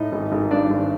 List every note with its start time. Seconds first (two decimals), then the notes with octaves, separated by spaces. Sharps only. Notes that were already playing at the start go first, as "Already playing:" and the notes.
Already playing: A2 D#4 D#5
0.12 G#1
0.32 G#1
0.51 G2 D4 D5
0.70 G#1